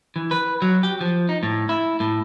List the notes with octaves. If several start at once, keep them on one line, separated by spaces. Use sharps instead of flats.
E3
B4
F#3
G4
F3
D#4
A2
E4
A2